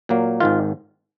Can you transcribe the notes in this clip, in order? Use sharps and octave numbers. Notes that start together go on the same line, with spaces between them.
A#2 F#3 A#3
G#1 G#2 D#3 F4